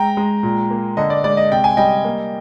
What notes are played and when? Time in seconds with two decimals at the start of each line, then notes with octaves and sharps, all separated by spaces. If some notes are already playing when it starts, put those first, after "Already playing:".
Already playing: G#3 G5 A#5
0.17 G#3
0.43 A#2
0.71 A#3
0.97 D3 D#5
1.10 D5
1.24 G#3 D5
1.37 D#5
1.51 C3 G5
1.64 G#5
1.77 G3 D#5 G5
2.05 A#3